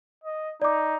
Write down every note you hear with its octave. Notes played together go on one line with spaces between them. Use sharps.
D#5
D#4 D5 D6